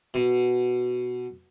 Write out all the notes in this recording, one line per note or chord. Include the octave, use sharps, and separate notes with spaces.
B2